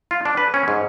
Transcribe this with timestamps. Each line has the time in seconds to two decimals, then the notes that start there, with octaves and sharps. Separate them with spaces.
0.11 F4
0.25 D4
0.37 B4
0.54 C#4
0.68 G#2